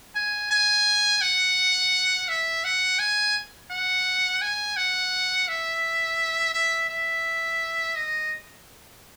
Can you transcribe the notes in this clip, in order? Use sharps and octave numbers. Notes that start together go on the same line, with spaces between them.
G#5
G#5
F#5
E5
F#5
G#5
F#5
G#5
F#5
E5
E5
E5
D#5